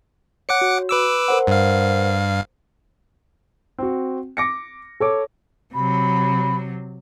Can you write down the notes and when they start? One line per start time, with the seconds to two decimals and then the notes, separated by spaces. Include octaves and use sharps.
0.49 C#5 F#5 D6 C#7
0.61 F#4
0.89 B4 D6 E6
1.28 A#4 C5 F#5
1.47 G2 F5
3.78 C4 F#4
4.37 D6 A#6 C#7
5.00 A4 C#5 D6
5.74 C3 F#3 B5